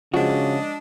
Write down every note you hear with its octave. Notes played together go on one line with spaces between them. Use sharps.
C#3 F3 G#3 D4 F#4 D#5